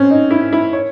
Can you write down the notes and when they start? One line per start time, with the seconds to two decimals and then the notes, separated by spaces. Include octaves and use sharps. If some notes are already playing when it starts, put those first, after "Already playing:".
Already playing: C4 C#4
0.10 D#4
0.31 E4
0.53 E4
0.73 C#5